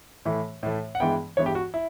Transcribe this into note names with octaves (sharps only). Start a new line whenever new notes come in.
A2 E3 A3
A2 E3 A3
F#5
G2 E3 G#3 B3 E4 G5
G2 E3 G#3 B3 E4 C#5
G4
F#4
E4